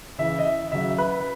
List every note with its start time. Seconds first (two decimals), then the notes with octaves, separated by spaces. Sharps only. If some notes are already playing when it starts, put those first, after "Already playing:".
0.18 C#3 E3 E5
0.39 D#5
0.45 E5
0.72 C#3 F#3 E5
0.98 B4 B5